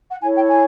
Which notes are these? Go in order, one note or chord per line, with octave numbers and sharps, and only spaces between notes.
F#5
E4 A4 C#5 G#5
G5
G#5